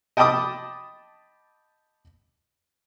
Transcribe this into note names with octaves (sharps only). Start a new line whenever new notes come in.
D#5 G5 A5 B5 D6 D#6